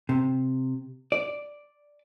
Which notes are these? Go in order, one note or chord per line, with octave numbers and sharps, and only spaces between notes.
C3
D5